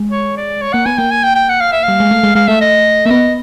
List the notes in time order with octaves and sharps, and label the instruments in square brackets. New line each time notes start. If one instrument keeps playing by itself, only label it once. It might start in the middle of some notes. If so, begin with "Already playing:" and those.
Already playing: [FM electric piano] G#3
[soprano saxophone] C#5
D5
C#5
[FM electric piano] A#3 [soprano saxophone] F#5
[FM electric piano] B3 [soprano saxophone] G#5
[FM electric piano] A#3 [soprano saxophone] G5
[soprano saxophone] G#5
G5
G5
F#5
F5
E5
F5
[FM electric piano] G3
G#3
A3
G#3
[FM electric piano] G#3 [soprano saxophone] F5
[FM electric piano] A3 [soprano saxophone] E5
[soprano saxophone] D#5
[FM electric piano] A#3 [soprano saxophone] E5
[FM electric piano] B3 [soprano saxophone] D#5